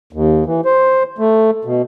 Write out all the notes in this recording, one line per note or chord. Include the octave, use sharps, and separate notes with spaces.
D#2
E3
C5
A3
B2